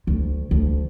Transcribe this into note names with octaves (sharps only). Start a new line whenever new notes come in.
D2
D2